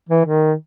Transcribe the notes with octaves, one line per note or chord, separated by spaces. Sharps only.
E3
D#3